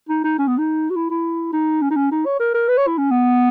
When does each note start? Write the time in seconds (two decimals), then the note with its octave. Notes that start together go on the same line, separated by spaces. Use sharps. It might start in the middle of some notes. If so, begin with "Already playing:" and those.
0.09 D#4
0.24 D#4
0.39 C#4
0.47 B3
0.58 D#4
0.90 F#4
0.96 E4
1.10 E4
1.53 D#4
1.82 C#4
1.91 D#4
1.96 C#4
2.11 D#4
2.26 C#5
2.40 A#4
2.54 A#4
2.68 B4
2.77 C#5
2.87 E4
2.98 C#4
3.11 B3